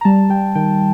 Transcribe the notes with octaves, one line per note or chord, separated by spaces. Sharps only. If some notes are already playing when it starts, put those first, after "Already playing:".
A#5
G3 A5
G3 G5
D#3 G5